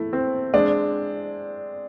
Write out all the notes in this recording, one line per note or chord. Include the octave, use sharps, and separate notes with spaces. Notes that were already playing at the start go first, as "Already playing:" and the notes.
Already playing: A3 E4
C4
G#3 D4